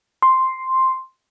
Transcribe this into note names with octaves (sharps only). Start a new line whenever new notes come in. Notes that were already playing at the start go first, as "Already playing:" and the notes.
C6